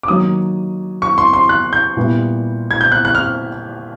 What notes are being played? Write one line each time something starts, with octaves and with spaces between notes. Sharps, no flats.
D6
D#3 F#3 A#3 D#6
C#6
C6
C6
F#6
G6
A#2 G3 B3 E4
G#6
G6
F#6
F#6
F6